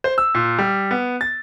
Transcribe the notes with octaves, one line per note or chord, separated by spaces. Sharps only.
C5
E6
A#2
G3
B3
A6